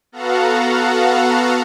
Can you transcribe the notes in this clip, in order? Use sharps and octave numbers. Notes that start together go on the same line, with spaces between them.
B3 F#4 A4 F5 F#5 A#5